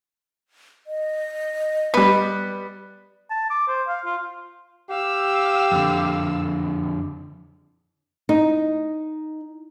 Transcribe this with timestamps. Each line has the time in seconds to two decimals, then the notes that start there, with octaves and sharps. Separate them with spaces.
0.87 D#5
1.94 G3 B3 B4
3.31 A5
3.50 D6
3.68 C5
3.88 F5
4.05 F4
4.90 G4 F5 E6
5.72 F2 D3
8.29 D#4